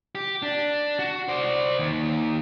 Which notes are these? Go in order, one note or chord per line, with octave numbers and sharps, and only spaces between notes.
G4
D4
F#4
C5 D5
D#2